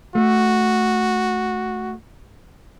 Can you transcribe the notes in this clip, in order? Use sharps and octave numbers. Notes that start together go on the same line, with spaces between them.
A3 F#4